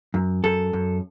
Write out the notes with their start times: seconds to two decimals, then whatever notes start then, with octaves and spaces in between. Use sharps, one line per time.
0.14 F#2
0.44 F#2 A4
0.73 F#2